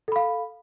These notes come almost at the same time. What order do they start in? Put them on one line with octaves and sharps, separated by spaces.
A4 B5 F5